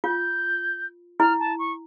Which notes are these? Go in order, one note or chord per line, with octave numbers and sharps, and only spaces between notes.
F4 G6
E4 F6
A5
C#6